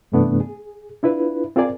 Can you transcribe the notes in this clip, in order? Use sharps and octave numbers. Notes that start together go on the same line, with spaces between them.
G2 C3 E3 A3 B3 D4
G#4
D4 E4 F4 B4
C4 F4 G#4 A#4 D5 G#5